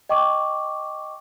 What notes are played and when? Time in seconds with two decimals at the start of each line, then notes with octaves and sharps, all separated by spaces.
0.09 D#5 G5 C#6 D6